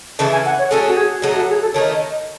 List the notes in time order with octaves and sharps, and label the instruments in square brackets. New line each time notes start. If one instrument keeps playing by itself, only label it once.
[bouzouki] C#3 E3 A3 E4 [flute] A5
[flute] G#5
F#5
C#5
[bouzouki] F#3 A3 C#4 G#4 [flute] A4
[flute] F#4
G#4
[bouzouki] A2 F#3 A3 D#4 [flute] G#4
[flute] F#4
G#4
A4
[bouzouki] D#3 A3 D#4 [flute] C#5
[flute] D#5